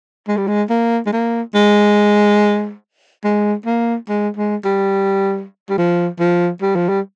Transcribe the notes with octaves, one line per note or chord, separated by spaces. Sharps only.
G#3
G3
G#3
A#3
G#3
A#3
G#3
G#3
A#3
G#3
G#3
G3
G3
F3
F3
G3
F3
G3